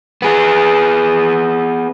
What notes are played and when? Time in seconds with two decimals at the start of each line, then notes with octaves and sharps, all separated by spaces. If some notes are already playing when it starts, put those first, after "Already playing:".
0.22 B3 G#4